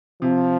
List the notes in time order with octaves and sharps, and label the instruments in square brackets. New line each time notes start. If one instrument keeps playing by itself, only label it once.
[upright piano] C3 [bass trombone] F3